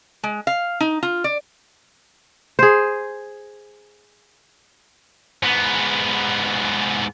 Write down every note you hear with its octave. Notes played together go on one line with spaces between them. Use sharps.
G#3
F5
D#4
F4
D5
G#4 C5
G#2 B3